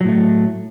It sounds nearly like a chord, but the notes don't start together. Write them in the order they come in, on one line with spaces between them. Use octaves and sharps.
F#3 A2 A3